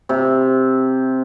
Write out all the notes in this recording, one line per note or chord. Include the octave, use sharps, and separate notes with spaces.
C3